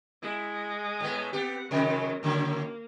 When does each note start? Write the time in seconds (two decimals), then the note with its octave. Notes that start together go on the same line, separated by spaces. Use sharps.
0.23 G#3 E4
1.00 A2 A3 B3
1.33 B3 C4 G4 F#5
1.71 C3 D#3 F#3 G#3 A#4
2.23 A2 C#3 F#3 A#3